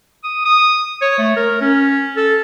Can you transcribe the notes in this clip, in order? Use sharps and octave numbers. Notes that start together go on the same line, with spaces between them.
D#6
D#6
C#5
A3
A#4
C#4
A4